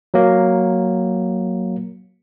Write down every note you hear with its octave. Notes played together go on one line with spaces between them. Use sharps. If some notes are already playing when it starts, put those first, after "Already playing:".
F#3 A#3